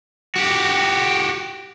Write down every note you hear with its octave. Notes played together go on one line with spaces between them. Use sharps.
F#4 G4